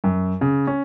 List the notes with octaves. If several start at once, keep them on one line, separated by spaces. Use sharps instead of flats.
F#2
C#3
C#4